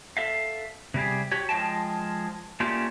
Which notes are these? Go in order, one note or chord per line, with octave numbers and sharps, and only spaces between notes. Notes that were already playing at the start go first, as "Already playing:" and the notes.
A4 E5 F5
C3 G3 G4 G#4
F#4 G4 C#5
F3 G#3 E5 G5 A5
A3 A#3 C#4 D4 F4 G4